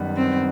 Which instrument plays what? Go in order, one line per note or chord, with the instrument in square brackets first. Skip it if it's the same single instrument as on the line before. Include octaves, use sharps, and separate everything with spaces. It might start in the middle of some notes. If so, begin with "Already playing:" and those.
Already playing: [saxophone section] F#2 D#3 G3 B3
[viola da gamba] C4